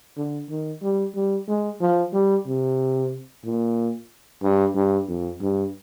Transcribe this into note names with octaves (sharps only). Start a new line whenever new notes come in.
D3
D#3
G3
G3
G#3
F3
G3
C3
A#2
G2
G2
F2
G2